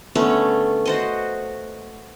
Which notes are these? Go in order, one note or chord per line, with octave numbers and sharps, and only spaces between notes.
D3 A3 B3 C#4
F#4 C5 D#5